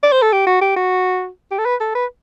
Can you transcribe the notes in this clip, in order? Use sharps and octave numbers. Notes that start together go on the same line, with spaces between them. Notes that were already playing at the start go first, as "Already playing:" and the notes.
D5
C5
A4
G4
F#4
G4
F#4
G4
A4
B4
A4
B4